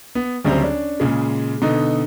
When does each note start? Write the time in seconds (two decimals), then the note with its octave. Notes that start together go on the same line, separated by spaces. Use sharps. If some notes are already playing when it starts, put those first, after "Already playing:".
0.15 B3
0.45 D2 C#3 F#3 G3 C4
0.61 C#4 D4
1.00 A#2 C#3 G#3
1.62 B2 D3 D#4